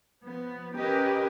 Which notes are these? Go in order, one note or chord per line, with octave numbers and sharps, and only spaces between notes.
F3 B3
C#4 G4 A#4 B4 D#5